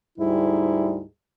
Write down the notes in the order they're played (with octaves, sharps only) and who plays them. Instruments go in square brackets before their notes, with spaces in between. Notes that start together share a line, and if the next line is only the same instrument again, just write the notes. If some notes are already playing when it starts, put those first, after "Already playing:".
[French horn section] D2 G#2 G3 [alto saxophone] E4